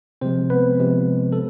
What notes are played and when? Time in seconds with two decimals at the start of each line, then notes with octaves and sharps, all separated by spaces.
0.21 C3 F3 G#3 C4 C5
0.50 B3 B4
0.79 C3 F3 G#3
1.33 A4